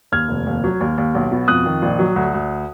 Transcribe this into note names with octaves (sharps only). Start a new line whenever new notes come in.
D#2 F6 G#6
F1
D#2
F#3
D#2
D#2
B1
B2
F2 D#6 F#6
D#3
A#1
F#3
D2
D2